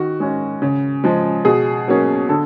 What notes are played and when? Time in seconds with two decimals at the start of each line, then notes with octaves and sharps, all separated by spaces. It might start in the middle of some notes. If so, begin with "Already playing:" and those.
Already playing: D#3 F#4
0.20 G#3 C#4
0.62 C#3
1.04 F3 G#3
1.45 B2 G#4
1.88 F#3 A#3 C#4
2.29 D3 A4